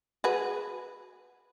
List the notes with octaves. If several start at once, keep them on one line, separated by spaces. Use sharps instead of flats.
F#4 G#4 B4